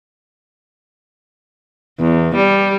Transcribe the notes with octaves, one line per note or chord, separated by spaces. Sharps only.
E2
G3